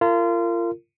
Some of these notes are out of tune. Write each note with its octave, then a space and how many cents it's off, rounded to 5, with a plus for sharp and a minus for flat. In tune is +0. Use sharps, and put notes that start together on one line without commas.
F4 -30 A#4 -30